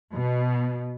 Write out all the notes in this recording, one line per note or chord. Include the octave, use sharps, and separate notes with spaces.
B2